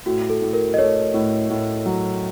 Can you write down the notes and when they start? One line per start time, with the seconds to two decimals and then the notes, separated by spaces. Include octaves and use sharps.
0.06 A2 F#4
0.30 A4
0.42 A2
0.53 A#4
0.74 D#5
0.78 A3 C#5
1.14 A2
1.50 A2
1.86 F#3